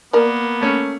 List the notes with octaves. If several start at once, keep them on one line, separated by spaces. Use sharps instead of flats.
A#3 B3 A#4 D5
A3 C#4